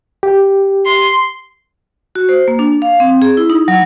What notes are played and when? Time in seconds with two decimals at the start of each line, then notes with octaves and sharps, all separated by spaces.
0.23 G4
0.86 C6
2.16 F#4
2.29 C5
2.48 A#3
2.59 D4
2.82 F5
3.00 C4
3.22 G#4
3.37 E4
3.50 D#4
3.68 F#3